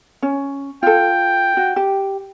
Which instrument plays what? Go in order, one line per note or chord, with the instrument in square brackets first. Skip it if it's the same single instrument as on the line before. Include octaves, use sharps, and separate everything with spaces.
[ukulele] C#4
[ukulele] F4 A4 [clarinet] G5
[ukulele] F#4
G4